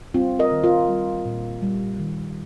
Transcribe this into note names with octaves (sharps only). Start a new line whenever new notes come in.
G3 C4 F4
A#4 D#5
D#3
F4 A#4
G3
A#2
G3
D#3